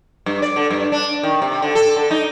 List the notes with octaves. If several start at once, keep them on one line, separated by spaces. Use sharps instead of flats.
G2
D5
D3
G2
D4
D#3
C3
D3
A4
D3
D#4